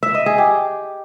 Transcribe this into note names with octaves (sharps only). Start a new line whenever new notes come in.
E5
D#5
G#4
G4